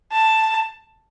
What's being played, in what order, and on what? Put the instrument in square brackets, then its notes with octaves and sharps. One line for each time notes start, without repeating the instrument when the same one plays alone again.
[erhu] A5